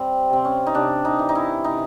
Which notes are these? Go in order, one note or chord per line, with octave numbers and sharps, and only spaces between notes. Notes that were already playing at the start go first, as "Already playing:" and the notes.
Already playing: G3 C4
C3 C4
C#4
D#4
C3 D4
D#4
E3
D#4
E4
C3 D#4